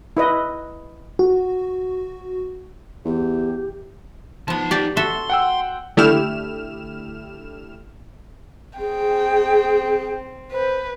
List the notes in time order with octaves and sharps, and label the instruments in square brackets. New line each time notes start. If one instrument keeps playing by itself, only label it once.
[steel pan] E4 B4 D#5
[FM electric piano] F#4
[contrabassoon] E2 [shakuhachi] G4
[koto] F3 B3 [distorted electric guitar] D#4 A5
[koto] G4 D5
[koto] F#4 A4 E5 [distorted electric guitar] C6
[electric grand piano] F#5 G5 E6
[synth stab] D3 A3 E4 G4 F6 E7
[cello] C4 [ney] G#4 [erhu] G5
[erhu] B4 [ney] C5